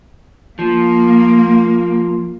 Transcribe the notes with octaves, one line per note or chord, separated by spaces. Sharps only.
F3 A#3